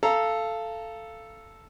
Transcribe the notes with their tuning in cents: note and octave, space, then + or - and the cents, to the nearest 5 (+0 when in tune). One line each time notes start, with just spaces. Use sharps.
A4 +0 F5 -20 A#5 +0